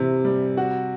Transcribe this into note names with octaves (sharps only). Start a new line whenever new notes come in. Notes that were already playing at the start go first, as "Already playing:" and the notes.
Already playing: C3 E3
G3
F#4